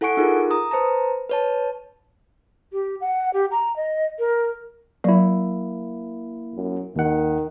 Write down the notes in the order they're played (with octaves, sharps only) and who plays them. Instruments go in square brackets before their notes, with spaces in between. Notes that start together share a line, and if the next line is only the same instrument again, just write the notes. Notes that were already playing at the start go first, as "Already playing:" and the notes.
[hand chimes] E4 A4 F#5 G#5 C#6 D7
D#4 F4 G#4 A#4
A#5 D#6
B4 C5 A5 A#5
B4 C#5 A5
[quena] G4
F#5
G4
A#5
D#5
A#4
[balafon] F#3 D5 [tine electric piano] A#3 E4
[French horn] F#2
[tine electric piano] D#2 F#5 [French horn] D#3